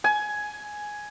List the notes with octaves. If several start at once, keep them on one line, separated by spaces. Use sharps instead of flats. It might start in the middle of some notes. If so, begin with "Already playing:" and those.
G#5